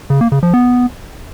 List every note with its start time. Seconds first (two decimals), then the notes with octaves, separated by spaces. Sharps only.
0.10 C#3
0.21 A#3
0.32 C#3
0.43 F3
0.54 B3